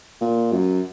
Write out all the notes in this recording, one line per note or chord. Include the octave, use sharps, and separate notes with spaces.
A#2
F#2